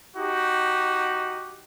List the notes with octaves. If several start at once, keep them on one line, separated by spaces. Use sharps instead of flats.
D#4 F#4 G4